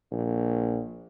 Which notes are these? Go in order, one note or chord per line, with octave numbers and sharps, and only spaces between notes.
A#1